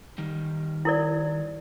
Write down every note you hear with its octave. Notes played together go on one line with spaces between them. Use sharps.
D#3 G3
E4 A#4 D5